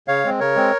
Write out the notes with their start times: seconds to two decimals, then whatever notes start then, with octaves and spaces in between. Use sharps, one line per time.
0.08 C#3 C#5 F5
0.24 G#3 C4
0.40 C#3 A#4 C#5
0.56 G#3 C4